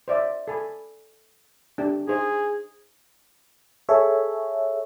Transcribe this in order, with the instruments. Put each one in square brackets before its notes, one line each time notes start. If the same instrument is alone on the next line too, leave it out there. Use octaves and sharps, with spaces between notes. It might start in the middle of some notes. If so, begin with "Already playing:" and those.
[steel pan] C5 D5 E5
A4 G#5 B5
D4 G4
[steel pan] D#4 C5 D#5 [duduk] G#4
[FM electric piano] G#4 A4 C#5 E5